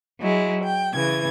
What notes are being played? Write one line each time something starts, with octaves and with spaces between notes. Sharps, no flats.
F#3 G#3 E4
G5
C#3 E3 G#6